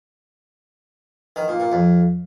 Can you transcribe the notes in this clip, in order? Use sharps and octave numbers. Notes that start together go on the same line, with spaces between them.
D#3
A#2
A#2
F2